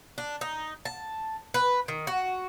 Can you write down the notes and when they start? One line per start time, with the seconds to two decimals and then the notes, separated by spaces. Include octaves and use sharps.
0.18 D4
0.41 D#4
0.85 A5
1.54 B4
1.88 D#3
2.07 F#4